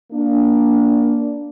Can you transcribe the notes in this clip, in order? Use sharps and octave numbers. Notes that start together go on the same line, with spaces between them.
A#3 D4